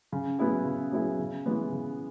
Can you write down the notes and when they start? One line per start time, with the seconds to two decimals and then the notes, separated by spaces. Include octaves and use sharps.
0.12 C#3
0.39 F#3 B3 E4 G#4
0.65 C#3
0.92 F#3 B3 E4 G#4
1.19 C#3
1.46 E3 G#3 B3
1.72 C#3